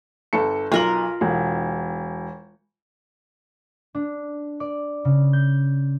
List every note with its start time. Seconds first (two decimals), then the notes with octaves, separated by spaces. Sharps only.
0.33 G1 A4 C#7
0.72 B1 F4 A#4 F#7
1.21 E1
3.95 D4
4.60 D5
5.05 C#3
5.33 G6